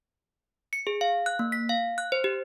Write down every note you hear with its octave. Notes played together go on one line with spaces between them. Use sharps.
C#7
G#4
F5
F#6
A#3
B6
F5
F#6
C5
G4